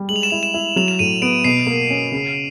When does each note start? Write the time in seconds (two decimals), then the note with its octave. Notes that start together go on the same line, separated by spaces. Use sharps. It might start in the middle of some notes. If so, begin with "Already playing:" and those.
Already playing: G3
0.09 G#3 F#7
0.16 F7
0.23 E7
0.30 E4 F7
0.43 E7
0.54 E4
0.76 F#3 F7
0.88 E7
0.99 A2 D#7
1.22 B3 D7
1.44 B2 C7
1.67 A#3
1.90 C#4
2.12 C#3